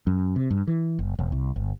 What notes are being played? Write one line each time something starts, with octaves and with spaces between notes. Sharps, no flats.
F#2
C3
G2
E3
F#1
E1
C2
G1